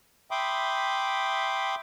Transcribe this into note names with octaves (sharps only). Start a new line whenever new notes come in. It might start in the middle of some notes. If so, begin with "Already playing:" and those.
E5 G5 B5 C6 D6 D#6